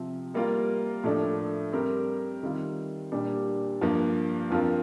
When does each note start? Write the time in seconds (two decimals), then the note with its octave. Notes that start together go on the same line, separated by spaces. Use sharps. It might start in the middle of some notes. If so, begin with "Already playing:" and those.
Already playing: C3 F3 C4
0.34 G3 A#3 F4 A#4
1.04 A2 F3 A3 D4
1.73 G3 C4 G4 A#4
2.43 D#3 G3 C4 F4
3.12 A#2 G3 D4 G4
3.81 G2 F3 A#3
4.50 G2 F3 C4 F4 A#4